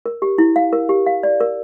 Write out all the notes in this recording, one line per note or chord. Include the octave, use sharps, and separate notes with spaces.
A#4
G4
E4
F5
A#4
G4
F5
D5
A#4